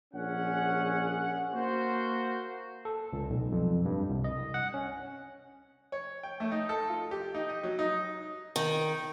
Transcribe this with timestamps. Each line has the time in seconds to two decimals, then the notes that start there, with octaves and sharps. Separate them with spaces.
0.14 A#1 C#4 G#4 F#5
1.53 A#3 F#4 C5
2.85 A4
3.13 C#2
3.30 B1
3.52 F2
3.85 G2
4.09 C2
4.24 D#5
4.54 F#5
4.74 C#4
5.92 C#5
6.23 G5
6.40 A3
6.52 D#4
6.69 A4
6.89 F4
7.11 G4
7.34 D#4
7.49 D#5
7.63 F#3
7.79 D#4
8.56 D#3